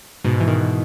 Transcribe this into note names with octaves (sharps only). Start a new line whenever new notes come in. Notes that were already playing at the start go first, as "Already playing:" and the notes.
G#2 B2
E3
B2 D#3